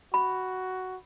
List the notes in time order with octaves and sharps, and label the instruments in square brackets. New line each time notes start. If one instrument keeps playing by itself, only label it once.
[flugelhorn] F#4 [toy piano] B5